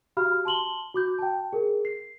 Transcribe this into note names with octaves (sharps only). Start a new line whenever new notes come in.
F#4 G4 F5 B5 F6
A5 C6 F#7 G7
F#4 D6 G6
G5 A5
G#4 A#4
C7